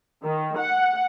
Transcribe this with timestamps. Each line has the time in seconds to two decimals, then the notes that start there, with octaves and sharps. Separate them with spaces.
0.24 D#3
0.59 F#5